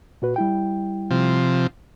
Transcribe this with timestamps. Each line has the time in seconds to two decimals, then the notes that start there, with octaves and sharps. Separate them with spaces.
0.22 A#2 F#4 B4
0.36 G3 E4 G5
1.11 C3 F3